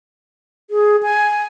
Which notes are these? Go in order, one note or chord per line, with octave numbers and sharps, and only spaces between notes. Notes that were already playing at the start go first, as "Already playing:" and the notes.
G#4
G#5